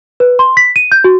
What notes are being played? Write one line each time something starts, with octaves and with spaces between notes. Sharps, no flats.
B4
C6
B6
D#7
G6
F#4